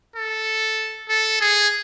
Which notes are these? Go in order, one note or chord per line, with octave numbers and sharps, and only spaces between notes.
A4
A4
G#4